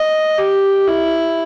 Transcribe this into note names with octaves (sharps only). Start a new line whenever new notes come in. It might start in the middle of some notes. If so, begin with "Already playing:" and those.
Already playing: D#5
G4
E4